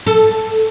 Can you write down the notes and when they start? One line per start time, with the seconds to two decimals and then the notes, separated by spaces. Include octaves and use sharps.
0.07 A4